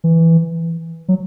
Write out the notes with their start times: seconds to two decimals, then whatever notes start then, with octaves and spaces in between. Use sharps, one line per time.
0.04 E3
1.08 F#3